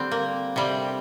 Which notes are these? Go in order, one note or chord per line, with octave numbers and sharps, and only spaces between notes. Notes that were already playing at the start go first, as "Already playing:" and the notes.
Already playing: D3 G3 C4 D4
A#3
C3 G3